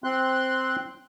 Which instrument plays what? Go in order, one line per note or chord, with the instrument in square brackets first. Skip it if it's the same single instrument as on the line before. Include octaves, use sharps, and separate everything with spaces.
[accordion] C4 C6 F#6